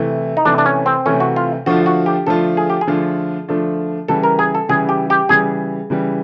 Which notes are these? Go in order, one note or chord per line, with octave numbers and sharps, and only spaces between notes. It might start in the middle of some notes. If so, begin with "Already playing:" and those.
Already playing: C3 E3 A3 E4
D#4
C3 E3 A3 D4
D4
C#4
C4
C3 E3 A3 C#4
F#4
F4
D3 F3 A3 D4 F4 F#4
F#4
G4
D3 F3 A3 D4 F4 A4
G#4
G4
G#4
D3 F3 A3 D4 F4
D3 F3 A3 D4 F4
C#3 E3 G3 A4
A#4
G#4
A4
C#3 E3 G3 G#4
G4
G4
C#3 E3 G3 G#4
C#3 E3 G3